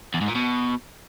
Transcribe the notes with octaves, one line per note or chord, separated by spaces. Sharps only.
E2
G#2
A#2
B2